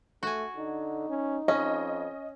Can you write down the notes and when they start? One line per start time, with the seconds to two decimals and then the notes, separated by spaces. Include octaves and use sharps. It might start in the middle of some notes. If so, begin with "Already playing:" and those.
0.23 A3 F#4 G#5
0.56 D3 D#4
1.09 C#4
1.48 F2 C#4 D#5